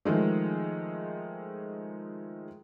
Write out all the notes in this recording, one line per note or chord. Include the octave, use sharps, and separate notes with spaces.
D#3 F3 G#3 A3